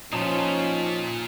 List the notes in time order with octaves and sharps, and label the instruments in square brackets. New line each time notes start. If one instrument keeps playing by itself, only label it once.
[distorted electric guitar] A#2 F4 [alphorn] F3 [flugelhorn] C#4 [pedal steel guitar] D#4 A5 C6